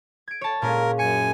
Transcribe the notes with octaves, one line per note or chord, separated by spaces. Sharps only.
G#6 D7
C#5 A5
A#2 G#3 C#4 A#4
F#2 G#5 C#7